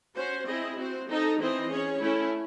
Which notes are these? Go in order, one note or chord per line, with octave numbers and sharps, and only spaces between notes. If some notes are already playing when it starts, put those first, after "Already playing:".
C#4 F#4 C5
C4 E4 G#4 D#5
C4 F#4 C5
C4 D#4 A4 D#5
E3 C4 E4 C5 D#5
C#4 G#4 C#5
A3 C#4 E4